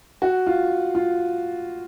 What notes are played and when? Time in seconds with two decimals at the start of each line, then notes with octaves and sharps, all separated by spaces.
0.22 F#4
0.47 F4
0.95 F4